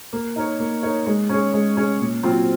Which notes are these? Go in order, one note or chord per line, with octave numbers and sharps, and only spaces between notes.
A#3
D#4 A#4 C#5
A#3
D#4 A#4 C#5
G#3
C#4 G#4 C#5
G#3
C#4 G#4 C#5
A#2
F#3 C4 F4 C5